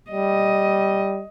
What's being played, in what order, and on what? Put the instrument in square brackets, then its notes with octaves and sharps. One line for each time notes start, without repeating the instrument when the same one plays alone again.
[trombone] G3 [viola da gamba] D#5